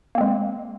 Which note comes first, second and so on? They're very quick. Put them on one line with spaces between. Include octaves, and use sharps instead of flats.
A#3 C4 G#3